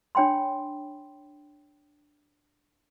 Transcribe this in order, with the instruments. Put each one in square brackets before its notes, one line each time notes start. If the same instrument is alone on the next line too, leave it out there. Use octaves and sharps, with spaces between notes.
[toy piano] D4 C#5 G5 B5 C6